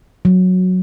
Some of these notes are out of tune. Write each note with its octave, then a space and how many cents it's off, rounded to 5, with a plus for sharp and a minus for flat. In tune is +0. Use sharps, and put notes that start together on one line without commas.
F#3 -10